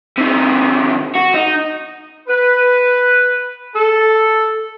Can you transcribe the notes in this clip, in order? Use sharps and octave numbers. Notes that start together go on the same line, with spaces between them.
C3 D#3
F#4
D#4
B4
A4